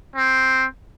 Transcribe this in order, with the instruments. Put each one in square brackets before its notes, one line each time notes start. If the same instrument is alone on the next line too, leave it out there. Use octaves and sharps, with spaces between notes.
[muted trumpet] C4